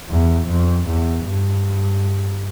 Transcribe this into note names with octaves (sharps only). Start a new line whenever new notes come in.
E2
F2
E2
G2